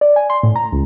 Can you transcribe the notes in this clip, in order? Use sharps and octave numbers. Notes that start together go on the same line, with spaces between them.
D5
G#5
C6
A2
A#5
C#2